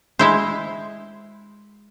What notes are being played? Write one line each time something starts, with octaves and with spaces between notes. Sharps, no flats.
G#3 E4 C5